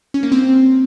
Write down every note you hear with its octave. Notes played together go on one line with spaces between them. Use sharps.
C#4
A#3
C4